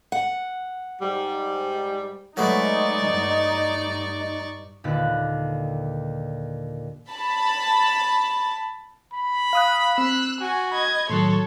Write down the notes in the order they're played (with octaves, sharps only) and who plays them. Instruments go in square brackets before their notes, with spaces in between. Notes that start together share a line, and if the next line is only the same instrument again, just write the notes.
[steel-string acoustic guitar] F#5
[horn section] G#2 G3
[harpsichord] F#3 A3 B3 [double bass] G#3 [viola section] D#4 [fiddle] D5 C#6
[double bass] G2
[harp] D#2 A#2 D3 B4 D5 F#6
[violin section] A5 B5
[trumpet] B5
[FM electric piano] F5 D#6 F#6
[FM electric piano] C4 [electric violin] E6 F#6
[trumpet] F#4 [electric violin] G#5
[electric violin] D#5 G#6 [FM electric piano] B5
[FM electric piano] A2 D#3 F#3 [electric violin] A4 C#5 [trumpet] C6